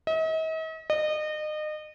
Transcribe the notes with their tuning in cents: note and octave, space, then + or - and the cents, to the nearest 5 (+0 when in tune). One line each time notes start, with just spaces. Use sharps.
D#5 +45
D#5 -30